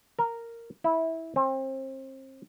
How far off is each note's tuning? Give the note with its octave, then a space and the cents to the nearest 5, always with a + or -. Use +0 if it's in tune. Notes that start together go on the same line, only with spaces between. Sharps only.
A#4 -10
E4 -15
C4 +30